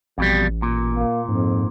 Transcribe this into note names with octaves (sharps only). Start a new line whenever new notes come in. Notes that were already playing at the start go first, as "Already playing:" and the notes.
A1 F2 B2 G3
A#2
A#3
F2 G#2